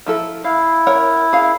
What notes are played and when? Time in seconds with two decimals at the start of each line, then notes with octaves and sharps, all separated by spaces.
0.06 F3 E4 A4
0.44 E4 F5
0.87 A#4 C#5 F#5
1.33 G#4 F5